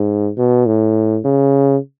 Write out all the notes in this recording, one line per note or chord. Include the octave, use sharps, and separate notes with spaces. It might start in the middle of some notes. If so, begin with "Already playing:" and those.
Already playing: G#2
B2
A2
C#3